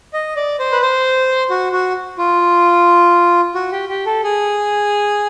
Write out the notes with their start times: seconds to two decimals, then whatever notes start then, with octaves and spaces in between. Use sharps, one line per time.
0.13 D#5
0.36 D5
0.59 C5
0.72 B4
0.82 C5
1.50 F#4
1.72 F#4
2.18 F4
3.55 F#4
3.72 G4
3.89 G4
4.06 A4
4.24 G#4